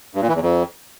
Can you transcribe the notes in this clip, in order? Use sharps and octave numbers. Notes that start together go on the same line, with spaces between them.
G2
A#2
E3
E2
F2